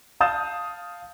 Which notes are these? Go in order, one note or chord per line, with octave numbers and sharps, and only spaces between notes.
F5 A5 D#6 G6 A6 E7